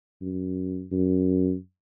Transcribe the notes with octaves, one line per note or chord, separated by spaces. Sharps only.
F#2
F#2